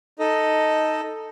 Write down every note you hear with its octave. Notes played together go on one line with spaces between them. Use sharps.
D#4 A4 D#5